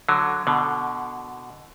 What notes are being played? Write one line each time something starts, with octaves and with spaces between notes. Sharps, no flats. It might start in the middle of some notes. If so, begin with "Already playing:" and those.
D3 F#3
B2 D3